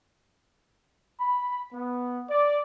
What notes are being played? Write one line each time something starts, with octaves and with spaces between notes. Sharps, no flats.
B5
B3
D5